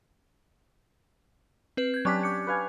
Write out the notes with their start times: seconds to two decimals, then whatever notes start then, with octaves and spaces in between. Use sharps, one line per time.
1.77 C4 B4
1.94 G6 G#6
2.05 F#3 C#4 D4 G4 A5 B6
2.23 D6 G6 C#7
2.47 B4 F5 G#5